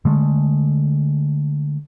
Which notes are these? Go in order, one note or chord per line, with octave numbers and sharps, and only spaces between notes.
D3 G#3 A3